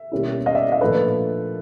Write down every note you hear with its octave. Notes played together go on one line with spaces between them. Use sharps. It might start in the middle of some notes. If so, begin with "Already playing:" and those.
Already playing: E5
B2 G3 A#3 C#4 E4
D#5 F5
D5 E5
D#5 F5
A#2 F3 A3 D4 A4 B4